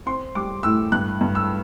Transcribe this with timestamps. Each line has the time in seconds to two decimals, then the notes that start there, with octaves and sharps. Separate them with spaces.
0.06 C4 C6
0.35 G3 D6
0.63 A2 E6
0.92 G2 F#6
1.21 G2
1.35 E6